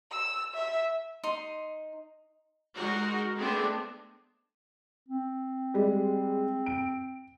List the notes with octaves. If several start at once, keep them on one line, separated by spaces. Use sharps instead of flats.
E6
E5
D#4 D#5 C6
G#3 D#4 F#4 A#4
G#3 A3 B3 C4 D4 G#4
C4
G3 G#3
D7